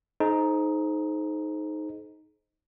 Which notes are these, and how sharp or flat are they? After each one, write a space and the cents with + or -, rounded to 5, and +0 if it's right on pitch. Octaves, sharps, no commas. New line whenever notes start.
D#4 +0 G#4 +45 C5 +0